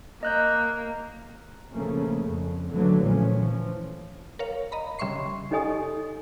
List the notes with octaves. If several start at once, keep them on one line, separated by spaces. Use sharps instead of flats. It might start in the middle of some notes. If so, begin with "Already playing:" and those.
A#3 D#5 F#6 G6
C#3 F3 A3 A#3 C#4
F2
D3 E3 F#3 A3 A#3
A#1 F3 C#4
E3 F3
A#4 C#5 F5
D#5 A#5 B5
C#3 G3 E5 C6 C#6 C7
D#4 G4 A4 D#5 G#5 D#6